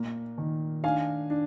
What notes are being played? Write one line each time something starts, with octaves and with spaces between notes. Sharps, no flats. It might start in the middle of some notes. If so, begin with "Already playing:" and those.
Already playing: A#2 A#3
D#3
D4 F5 G#5
D4